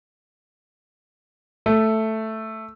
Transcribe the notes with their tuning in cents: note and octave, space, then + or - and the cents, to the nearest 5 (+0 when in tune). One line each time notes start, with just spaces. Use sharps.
A3 +5